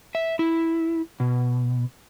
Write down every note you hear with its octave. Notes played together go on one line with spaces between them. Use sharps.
E5
E4
B2